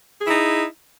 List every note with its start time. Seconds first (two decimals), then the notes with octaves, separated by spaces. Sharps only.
0.19 G#4
0.24 E4
0.29 D#4